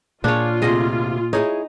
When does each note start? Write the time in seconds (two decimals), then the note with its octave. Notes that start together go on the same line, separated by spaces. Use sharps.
0.24 A#2 A#3 D4 F4 G#4 C#5
0.62 D2 C3 G#4 D#5
1.33 D#4 E4 G#4 C#5